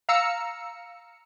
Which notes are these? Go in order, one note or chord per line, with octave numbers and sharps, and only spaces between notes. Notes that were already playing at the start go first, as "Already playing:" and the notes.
F5 A#5 E6 C#7